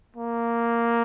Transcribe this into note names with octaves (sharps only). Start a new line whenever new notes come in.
A#3